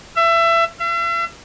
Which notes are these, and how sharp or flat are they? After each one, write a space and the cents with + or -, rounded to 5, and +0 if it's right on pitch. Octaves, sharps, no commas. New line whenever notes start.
E5 +25
E5 +45